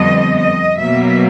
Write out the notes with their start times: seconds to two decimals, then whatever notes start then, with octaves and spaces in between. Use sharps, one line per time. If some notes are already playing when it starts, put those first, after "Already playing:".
Already playing: F2 D3 G3 B3 D#5
0.40 D#5
0.79 B2 F#3 A#3 E5